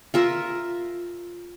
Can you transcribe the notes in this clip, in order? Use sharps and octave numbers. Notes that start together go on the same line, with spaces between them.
F4 A#4 E5